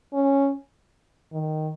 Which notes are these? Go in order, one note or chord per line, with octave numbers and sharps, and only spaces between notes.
C#4
D#3